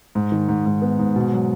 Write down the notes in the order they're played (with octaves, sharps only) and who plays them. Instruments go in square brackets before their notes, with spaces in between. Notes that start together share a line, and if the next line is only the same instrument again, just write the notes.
[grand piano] G#2
D#3
G#2
G#2
B3
G#2
B2
F#3